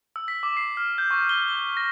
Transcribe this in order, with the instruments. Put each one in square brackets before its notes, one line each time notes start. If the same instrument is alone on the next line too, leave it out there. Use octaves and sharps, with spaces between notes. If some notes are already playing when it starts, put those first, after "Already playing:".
[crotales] E6
B6
D6
C7
F6
G6
C#6
G7
G7
A#6